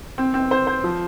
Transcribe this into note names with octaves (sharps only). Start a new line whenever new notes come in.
C4
C4
C5
C5
F3